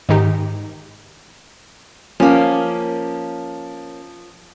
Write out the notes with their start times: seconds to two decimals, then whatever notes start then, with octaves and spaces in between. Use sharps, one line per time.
0.09 G#2 D#3 D#4 G4
2.20 F3 A#3 C#4